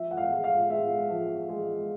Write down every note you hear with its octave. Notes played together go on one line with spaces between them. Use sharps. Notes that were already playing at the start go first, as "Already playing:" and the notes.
Already playing: F3 E5
F#5
F5
G#3
F5
G#3 E5
F3
G#3